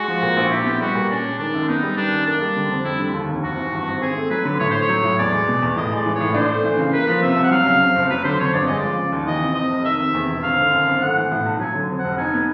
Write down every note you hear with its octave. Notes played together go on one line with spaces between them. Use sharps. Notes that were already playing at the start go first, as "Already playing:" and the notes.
Already playing: G#3 F#4
F3
A#2
A#1
E4 G4
B3
G3 F#4
A#2
C#4 D4
G#3
D#3 D4
F#2
B3 D#4
G3
D#3 D4
F#2
A#3 D4
G3
D3
F2
G3 E4
D3
D#2
F1
G#1 F#4
E3
G2
G#1
C4 G#4
A3
F#3 B4
D3
A2 C#5
A3 C5
C#5
F#3
A2
E2 D5
G#3
B2
E2
A2 D#5
G#3 D5
E3
C#5
A2
D4 C5
A3
E3
C#3
A#3 B4
F3
C3 E5
C2
F#5
F#3 F5
C#3
F2
F#1
F#3 B4
D3 C5
F2 C#5
G1 D5
G#3 D#5
F3 D5
C#3
D#2
E3 D#5
C3
F2 D#5
F1
D#3 E5
C3
E2
E1
G#1 F5
D3
F#2
G#1
A3 F#5
E3
A2
B1
F#3 G#5
D3
F2
F#5
F1
D#4 G#5
B3